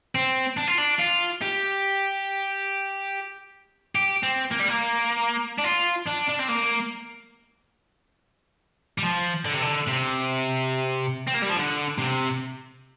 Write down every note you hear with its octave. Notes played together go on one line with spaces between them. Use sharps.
C4
D4
F4
D4
F4
G4
G4
C4
A#3
G3
A#3
D4
F4
D4
D4
C4
A#3
G3
F3
D3
C3
D3
C3
C4
A#3
G3
F3
D3
C3